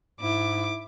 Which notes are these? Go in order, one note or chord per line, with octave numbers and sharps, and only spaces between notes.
G#2 E4 D6